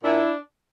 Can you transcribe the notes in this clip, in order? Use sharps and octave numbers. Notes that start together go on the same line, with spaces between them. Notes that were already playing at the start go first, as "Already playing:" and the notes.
A#2 D4 E4